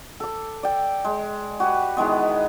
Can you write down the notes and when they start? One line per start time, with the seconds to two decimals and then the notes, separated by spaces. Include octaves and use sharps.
0.20 A4 D6
0.63 D5 G5
1.05 G#3
1.60 F#4 G4 B4
1.97 D#3 E3 G#3 B3